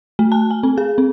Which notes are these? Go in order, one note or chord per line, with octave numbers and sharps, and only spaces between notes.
A3
A5
G#5
C4
G#4
C4